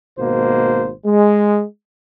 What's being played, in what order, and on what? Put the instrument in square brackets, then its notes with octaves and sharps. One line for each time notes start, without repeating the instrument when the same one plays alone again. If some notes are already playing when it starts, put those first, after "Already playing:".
[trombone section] G#1 B2 A#3 C5
G#3